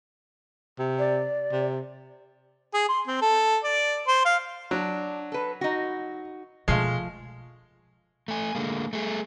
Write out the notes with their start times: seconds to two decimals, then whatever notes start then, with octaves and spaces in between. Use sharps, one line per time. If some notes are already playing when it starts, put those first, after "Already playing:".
0.79 C3
0.99 D5
1.52 C3
2.74 G#4
2.89 C6
3.07 C4
3.22 A4
3.64 D5
4.08 C5
4.25 F5
4.71 F#3 D4
5.32 A4 B4
5.61 D#4 F#4
6.68 B2 F3 G#3 A3 F5
8.28 A3 G#5
8.55 D3 G#3 A#3
8.93 A3 G#4